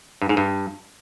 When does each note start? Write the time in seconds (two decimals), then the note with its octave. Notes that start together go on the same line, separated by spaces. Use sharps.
0.22 G2
0.29 G#2
0.37 G2